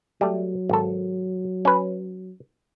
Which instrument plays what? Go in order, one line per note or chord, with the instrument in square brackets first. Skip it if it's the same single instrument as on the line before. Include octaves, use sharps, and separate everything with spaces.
[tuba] F#3 [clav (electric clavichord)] G3 A3
[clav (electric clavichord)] G#1 A4
C#4 B4